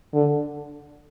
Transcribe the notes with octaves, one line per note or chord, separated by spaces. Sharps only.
D3